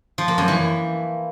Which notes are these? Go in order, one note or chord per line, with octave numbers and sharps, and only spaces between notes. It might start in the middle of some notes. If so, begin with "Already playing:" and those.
F3
A#3
F#2
E3